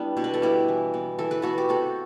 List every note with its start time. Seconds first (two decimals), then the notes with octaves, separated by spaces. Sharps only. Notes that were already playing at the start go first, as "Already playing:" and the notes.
Already playing: G3 B3 D4 E4
0.17 B2
0.24 B4
0.34 A4
0.42 G3 B3 E4 G4
0.68 E3
0.94 B3
1.19 E3 A4
1.31 B4
1.42 B3 F#4 A4
1.58 G4
1.69 C3 F#4 A4